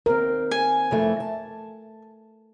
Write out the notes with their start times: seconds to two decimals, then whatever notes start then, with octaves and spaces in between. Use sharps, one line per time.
0.06 D#2 C4 A#4
0.51 G#5
0.91 F2 E3 A3
1.20 A5